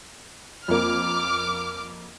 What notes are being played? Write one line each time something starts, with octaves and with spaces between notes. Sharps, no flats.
F2 A#3 D6 F6